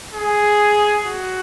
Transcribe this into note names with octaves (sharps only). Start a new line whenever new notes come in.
G#4
F#4